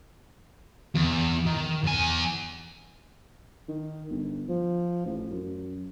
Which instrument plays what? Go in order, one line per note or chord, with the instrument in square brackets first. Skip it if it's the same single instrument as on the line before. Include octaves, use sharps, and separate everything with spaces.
[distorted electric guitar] E2
D#3
E2 G#5
[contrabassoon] D#3
G1
F3
A1
F#2